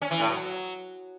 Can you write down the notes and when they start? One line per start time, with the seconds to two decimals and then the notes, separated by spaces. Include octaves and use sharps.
0.02 C#4
0.11 E3
0.20 A2
0.29 F#3